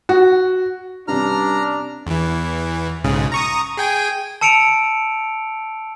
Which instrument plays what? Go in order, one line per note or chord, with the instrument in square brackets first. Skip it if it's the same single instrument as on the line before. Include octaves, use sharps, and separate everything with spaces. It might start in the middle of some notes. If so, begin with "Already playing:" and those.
[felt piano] F#4
[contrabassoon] G2 [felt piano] C3 C#4 [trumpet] D4 [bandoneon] A#5 F6
[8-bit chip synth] E2 E3
B1 G#2 C#3
A#5 C#6 D#6
G#4 G5 G#5
[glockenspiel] A5 E6 C#7 D7 F7